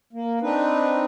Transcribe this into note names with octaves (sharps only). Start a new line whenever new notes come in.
A#3
C4 D4 D#4 B4